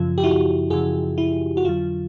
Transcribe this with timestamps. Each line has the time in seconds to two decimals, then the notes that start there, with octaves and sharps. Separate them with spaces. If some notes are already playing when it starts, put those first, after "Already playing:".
Already playing: F#2 C#3 F3 F4
0.18 G4
0.24 E4 F#4
0.70 F#2 C#3 F3 F#4 G#4
1.18 E4
1.57 F#4
1.64 F2 D3 F#3 F4